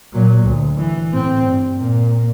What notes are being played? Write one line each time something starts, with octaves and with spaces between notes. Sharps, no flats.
A#2 F#3
D2
E3
A2 C4
G2
A#2 A#3